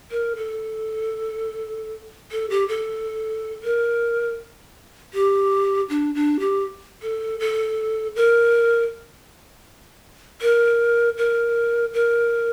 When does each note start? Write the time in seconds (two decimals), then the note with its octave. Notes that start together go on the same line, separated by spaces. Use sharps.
0.11 A#4
0.36 A4
2.32 A4
2.50 G4
2.68 A4
3.64 A#4
5.14 G4
5.89 D4
6.15 D4
6.40 G4
7.02 A4
7.40 A4
8.16 A#4
10.42 A#4
11.18 A#4
11.93 A#4